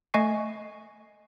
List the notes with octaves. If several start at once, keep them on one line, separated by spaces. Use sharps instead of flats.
A3 D#5 G#5 C#6 C7